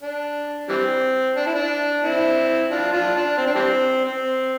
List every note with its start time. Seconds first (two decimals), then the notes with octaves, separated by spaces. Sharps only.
0.02 D4
0.69 E3 G3 C4
1.37 D4
1.46 E4
1.55 D4
2.03 C4 E4
2.71 D4 F4
2.93 D4 F4
3.16 D4
3.37 C4
3.47 D4
3.55 E3 G3 C4
4.04 C4